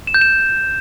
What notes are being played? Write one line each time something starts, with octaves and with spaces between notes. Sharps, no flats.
E7
G6
E7